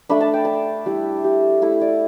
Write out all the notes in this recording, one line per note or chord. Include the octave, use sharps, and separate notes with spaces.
A3 D4 B5
A5
G5
A5
G3 E4 G5
G4
A3 E4 A4
D5